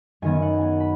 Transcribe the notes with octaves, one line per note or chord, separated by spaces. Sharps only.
F#2 D#3 F#3 B3 G#5
F#5
G#5
B5